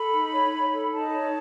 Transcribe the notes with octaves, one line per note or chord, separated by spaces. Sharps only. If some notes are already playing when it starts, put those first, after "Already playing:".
Already playing: A4 B5
D#4
C#5
D#4
A4
D#4 A5
C#5